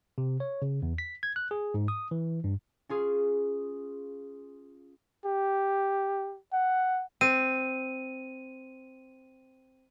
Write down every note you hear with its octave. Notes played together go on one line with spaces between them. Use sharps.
C3
C#5
C#3
E2
B6
G#6
F#6
G#4
G#2
D#6
E3
G2
C#4 F4 G#4
G4
F#5
C4 D#7